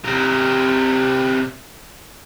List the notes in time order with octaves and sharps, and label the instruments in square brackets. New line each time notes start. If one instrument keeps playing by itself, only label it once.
[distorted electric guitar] C3 A#4